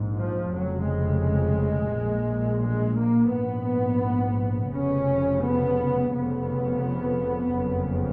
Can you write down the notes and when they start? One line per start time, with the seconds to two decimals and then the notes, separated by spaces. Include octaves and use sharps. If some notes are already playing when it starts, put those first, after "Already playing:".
Already playing: A#1 G#2
0.18 F3
0.53 F1 F2 C#3 F#3
0.88 G#3
1.94 A#1 A#2
2.63 G#3
2.98 A#3
3.33 A#1 G#2 B3
4.73 F1 F2 C#3 C#4
5.43 B3
6.13 F1 F2 C#3 B3
7.53 F#1 F2 C#3